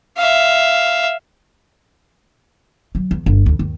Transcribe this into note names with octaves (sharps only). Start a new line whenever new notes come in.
E5 F5
F#3
E2
G1
D2
D#2